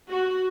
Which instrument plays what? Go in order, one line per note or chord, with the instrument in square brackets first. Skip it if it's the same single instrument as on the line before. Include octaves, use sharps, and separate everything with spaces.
[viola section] F#4